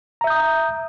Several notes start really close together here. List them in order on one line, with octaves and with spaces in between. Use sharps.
A#5 E5 G6 D#6